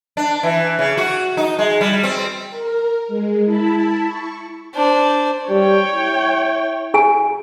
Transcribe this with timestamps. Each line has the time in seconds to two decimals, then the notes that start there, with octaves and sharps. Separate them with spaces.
0.17 D4
0.43 E3
0.79 C#3
0.97 F#4
1.37 D#4
1.59 G#3
1.81 G3
2.04 C4
2.50 A#4
3.08 G#3
3.45 E4 A5 B5
4.05 C#6
4.75 D4 C5
5.50 G3 C#5 G5
5.92 E4
6.94 G#4 G#5